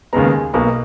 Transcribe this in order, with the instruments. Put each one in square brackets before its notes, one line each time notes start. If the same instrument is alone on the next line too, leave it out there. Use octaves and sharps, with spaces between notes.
[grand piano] D#2 C#3 G#3 B3 A#5
G#5
B1 B2 A#3 A#5